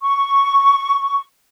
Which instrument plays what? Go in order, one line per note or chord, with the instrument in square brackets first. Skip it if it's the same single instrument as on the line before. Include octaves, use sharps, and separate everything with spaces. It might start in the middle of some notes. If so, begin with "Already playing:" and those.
[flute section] C#6